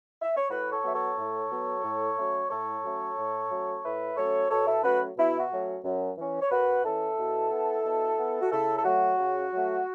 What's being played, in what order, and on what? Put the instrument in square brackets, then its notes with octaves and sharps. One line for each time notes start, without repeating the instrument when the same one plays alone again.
[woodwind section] E5
C#5
A2 F#4 B4
A4 C#5
F#3 B3 E5
A4 C#5
A2
F#3 B3
A2
F#3 A3 C#4
A2 A4 C#5
F#3 A3 C#4
A2
F#3 A3 C#4
A2 B4 E5
F#3 A3 C#4 A4 C#5
B2 A4 C#5
E4 A4
F#3 A3 C#4 F#4 B4
B2 E4
F#4
F#3 A3 C#4
F#2
E3 C#4
C#5
F#2 F#4 B4
E3 C#4 E4 A4
B2
B3
B2
B3
F#4
C#3 E4 A4
A4
F#3 A3 F#4
C#3
F#3 A3